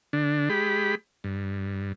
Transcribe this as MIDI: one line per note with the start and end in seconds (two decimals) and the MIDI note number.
0.13 0.49 50
0.13 0.49 62
0.49 0.95 56
0.49 0.95 67
0.49 0.95 83
1.24 1.93 43